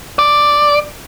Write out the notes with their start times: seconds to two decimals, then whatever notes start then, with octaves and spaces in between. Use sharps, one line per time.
0.19 D5